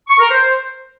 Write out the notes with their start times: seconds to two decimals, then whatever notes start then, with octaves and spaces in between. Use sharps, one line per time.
0.08 C#6
0.19 A#4
0.30 C5